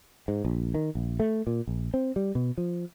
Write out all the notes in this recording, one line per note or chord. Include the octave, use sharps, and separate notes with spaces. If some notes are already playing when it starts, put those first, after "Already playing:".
G#2
A#1
D#3
A#1
A3
A#2
A#1
C4
G3
B2
F3